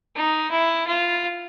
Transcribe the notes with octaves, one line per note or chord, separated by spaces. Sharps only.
D#4
E4
F4